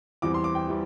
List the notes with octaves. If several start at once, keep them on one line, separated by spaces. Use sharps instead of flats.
E2 E3 G3 C4 D6
C6
D6
G5
E3 G3